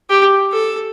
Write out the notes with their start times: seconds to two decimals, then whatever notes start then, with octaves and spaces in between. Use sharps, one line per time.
0.10 G4
0.52 A4